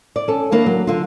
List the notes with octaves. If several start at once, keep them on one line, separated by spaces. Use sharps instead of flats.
D5
C#4 A4
D#3 A#3 D4 E4
F#3
D3 F4